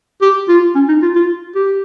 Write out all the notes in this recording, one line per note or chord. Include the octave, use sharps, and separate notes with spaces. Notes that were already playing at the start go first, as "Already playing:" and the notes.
G4
F4
C#4
D#4
F4
F4
G4